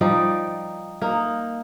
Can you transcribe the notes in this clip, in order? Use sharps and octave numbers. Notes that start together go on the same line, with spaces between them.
F3 G3 D#4 D5
A#3 D#4